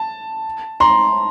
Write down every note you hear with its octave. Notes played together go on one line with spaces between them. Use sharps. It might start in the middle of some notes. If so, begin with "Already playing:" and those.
Already playing: A5
A#5 C6